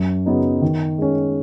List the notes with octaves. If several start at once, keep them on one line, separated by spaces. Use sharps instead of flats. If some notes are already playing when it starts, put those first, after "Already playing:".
Already playing: F#2
C#3 F#3 B3 D#4
D#3
G#3 C#4